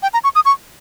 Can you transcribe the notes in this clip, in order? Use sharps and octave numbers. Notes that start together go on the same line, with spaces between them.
G5
A#5
C#6
D#6
C#6